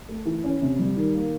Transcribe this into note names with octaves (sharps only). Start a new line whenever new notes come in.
A3
E3
C#4
C3
G3
D#3
A#3